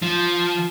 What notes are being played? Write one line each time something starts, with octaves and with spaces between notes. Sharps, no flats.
F3